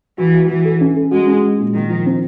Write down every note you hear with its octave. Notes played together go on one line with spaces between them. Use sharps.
E3 F#4
F#4
E3 F#4
A4
C#4
A4
G#3 F#4
C#4
G#3
A#2
A#2 D#3
F3
C4